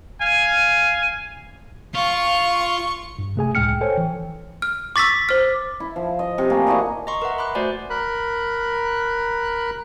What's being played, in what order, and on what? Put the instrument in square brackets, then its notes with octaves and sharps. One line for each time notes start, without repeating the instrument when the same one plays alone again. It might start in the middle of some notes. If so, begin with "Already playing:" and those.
[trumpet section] F5 G#5
[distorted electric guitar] F4 [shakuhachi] F5 [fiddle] C#6
[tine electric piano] G2
C3 A3 G#4 G#5
C#2 A2 G#3 G5 F6 C#7
A4 C5 C#5 G5 G#5
E3
[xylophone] F6
[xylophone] C#6 E6 [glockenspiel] D6 A6 B6
[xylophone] C5 F6
[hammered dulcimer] E4
F3
D#5
C3
A3 A#3 G#5
D4 E4 F#4 D#5
[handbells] D#5 A#5 C6 C#6
A#4 B4 E5 F#5
B5 C6 D6 F#6
A3 F#4 C5 D5 G#5
[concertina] A#4 B5 F#6